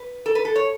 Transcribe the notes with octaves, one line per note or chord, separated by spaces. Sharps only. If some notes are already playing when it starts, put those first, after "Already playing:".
Already playing: B4
A4
B4
A4
C#5